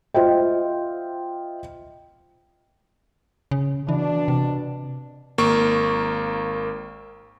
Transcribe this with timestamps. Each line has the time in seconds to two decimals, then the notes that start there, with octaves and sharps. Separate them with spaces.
0.14 F4 C5 D#5 E5 G5
3.51 C#3
3.89 B2 E3 D4
4.28 C3
5.38 G#1 A#3 C#6